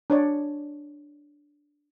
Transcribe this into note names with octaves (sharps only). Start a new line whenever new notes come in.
D4 C#5 D5